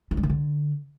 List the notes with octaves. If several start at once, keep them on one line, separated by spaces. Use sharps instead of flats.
E3
G3
D#3
D3